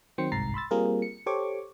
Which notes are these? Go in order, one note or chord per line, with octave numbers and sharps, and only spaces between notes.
D#3 F#3 C4 G5 C6 C#7
G1 C2 G#2 A#5 A6 C7
B5 C6 E6 A6
G3 A#3 C4 F4 G#4 A#4
C#7
G4 A4 C5 C#5 C#6 D6